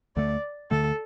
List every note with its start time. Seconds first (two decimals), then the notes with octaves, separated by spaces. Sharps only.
0.16 D2 D3 A3 D5
0.71 D2 D3 A3 A4